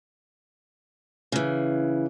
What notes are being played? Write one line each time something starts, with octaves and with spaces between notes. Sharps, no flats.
C#3 E3